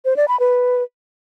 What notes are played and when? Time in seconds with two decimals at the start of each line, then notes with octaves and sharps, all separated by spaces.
0.05 C5
0.16 D5
0.28 B5
0.40 B4